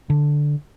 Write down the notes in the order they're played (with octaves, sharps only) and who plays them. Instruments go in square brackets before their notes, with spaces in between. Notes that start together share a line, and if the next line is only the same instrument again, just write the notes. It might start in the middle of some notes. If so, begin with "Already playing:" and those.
[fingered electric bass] D3